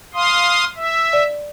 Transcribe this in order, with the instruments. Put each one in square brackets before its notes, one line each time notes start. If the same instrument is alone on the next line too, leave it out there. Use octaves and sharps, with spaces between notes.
[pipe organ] F5 C6 D#6
E5
[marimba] D5